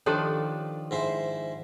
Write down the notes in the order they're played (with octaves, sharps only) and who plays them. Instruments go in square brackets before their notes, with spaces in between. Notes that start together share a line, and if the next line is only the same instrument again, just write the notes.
[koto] D#3 F3 D4 [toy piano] G4 A4 C#5
[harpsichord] G#2 E4 C5